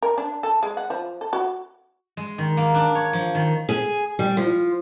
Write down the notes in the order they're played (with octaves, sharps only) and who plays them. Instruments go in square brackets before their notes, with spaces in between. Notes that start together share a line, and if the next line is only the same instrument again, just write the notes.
[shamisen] A#4
D4
A4
G#3
F#5
F3
A4
F#4
[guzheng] G#3
D#3
A#3
D4
C#5
F3
D#3
[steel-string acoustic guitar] G#4
G3
F3